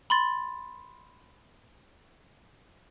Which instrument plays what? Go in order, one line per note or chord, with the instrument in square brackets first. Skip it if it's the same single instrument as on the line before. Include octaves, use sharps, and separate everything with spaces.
[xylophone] B5 C6 A6